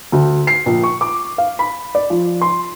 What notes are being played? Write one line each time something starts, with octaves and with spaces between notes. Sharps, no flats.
D2
C7
A#1
C#6
D6
F5
B5
D5
F3
C6